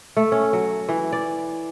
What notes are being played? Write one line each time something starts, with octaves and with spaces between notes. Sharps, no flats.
A3
C#4
F#3
E3
D5